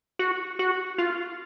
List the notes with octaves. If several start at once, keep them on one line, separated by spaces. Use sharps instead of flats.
F#4
F#4
F4